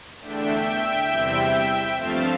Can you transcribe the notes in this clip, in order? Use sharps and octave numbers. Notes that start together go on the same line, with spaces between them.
E2 D3 A3 D4 E5 G5
E2 C3 G3 C4 E4
G2 F3 A3 C4 F5 A5